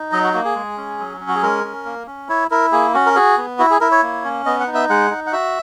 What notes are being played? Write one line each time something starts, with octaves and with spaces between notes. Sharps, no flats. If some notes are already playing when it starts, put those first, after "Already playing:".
Already playing: D#4
F#3 D#5
F#4
A#3 F#4
G#4
G#3
C#4
F#3
C#4
F#4
G#4
G#3 A#4
C#4
A#3
C#4
E4 C#5
E4 A#4
A#3 G#4
C#4 F#4
A#4
F#4 G#4
B3
E4 F#4
G#4
E4 A#4
C#5
A#3
C#4
B3 D#5
F#5
D#4
E5
G#3 F#5
D#4
F#5
F#4 E5